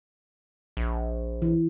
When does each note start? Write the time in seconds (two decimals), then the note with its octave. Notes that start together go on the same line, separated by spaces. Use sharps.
0.77 A#1
1.42 E3